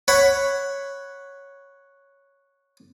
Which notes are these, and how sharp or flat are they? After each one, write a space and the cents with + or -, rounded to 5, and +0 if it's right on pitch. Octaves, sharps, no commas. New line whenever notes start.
C#5 +0 F#5 +0 B5 +10